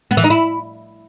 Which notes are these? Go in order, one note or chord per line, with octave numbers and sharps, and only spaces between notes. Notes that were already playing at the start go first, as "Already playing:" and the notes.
B3
E3
D#4
E4